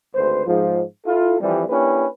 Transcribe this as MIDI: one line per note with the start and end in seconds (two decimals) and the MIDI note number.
0.15 0.45 32
0.15 0.45 38
0.15 0.45 71
0.15 0.45 72
0.46 0.82 44
0.46 0.82 53
1.05 1.35 64
1.05 1.35 65
1.05 1.35 69
1.40 1.64 41
1.40 1.64 52
1.40 1.64 53
1.40 1.64 55
1.69 2.06 58
1.69 2.06 61
1.69 2.06 62
1.69 2.06 64
1.69 2.06 67
1.69 2.06 71